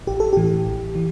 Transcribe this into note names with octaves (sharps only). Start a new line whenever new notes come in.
A1 G4
A4
A2 E3 G4
A1
E3